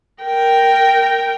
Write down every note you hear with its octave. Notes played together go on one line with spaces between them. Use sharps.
A#4 G5